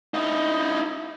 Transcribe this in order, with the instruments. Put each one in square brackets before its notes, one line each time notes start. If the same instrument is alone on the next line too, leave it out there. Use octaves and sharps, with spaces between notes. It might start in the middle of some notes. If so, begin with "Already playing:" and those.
[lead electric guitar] D#4 E4